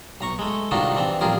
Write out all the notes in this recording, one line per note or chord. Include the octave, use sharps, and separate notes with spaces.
B1 A#5 C#6
G#3 A3
C2 D#3 D4 D#4 F4 F#4
E3 C4 D4
A1 F2 G3 F4 G#4 A#4